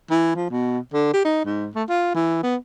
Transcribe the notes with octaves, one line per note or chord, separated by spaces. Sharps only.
E3
F3
B2
D3
G4
D#4
G#2
A3
F4
E3
B3